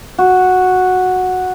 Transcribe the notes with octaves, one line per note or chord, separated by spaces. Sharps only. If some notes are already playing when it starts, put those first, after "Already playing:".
F#4